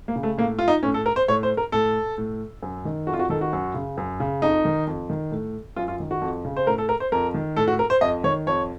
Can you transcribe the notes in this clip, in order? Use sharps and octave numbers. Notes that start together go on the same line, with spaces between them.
A#3
C#3
A3
A2 A#3
F4
D#4
A2 C#4
A4
A#4
C5
A2 C#5
C5
A#4
A2 A4
A2
F#2
D#3
F2 F#4
F4
F#4
D#3 A4
F#4
F#2
C#3
F#2
C#3
F2 D#4
D#3
F2
D#3
A2
F#2 F4
F4
D#3
F#4
F2
C#3
C5
A2 A#4
A4
A#4
C5
F2 A#4
D#3
A2 A4
F#4
A#4
C5
F2 D#5
D#3 C#5
F2 C#5